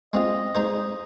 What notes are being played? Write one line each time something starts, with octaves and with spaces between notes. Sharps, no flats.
G#3 C4 F4 D#5
G#3 D#4 G#4 C5